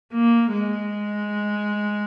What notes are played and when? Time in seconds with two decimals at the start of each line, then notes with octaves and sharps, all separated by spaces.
0.13 A#3
0.53 G#3